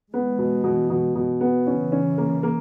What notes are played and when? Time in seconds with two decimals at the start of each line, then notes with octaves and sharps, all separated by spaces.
0.13 E3 G#3 B3
0.38 B2
0.64 B2
0.90 B2
1.15 B2
1.41 B3
1.66 C#3 E3 C#4
1.92 C#4
2.18 A#3
2.43 A#3